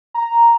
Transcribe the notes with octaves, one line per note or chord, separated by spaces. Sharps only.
A#5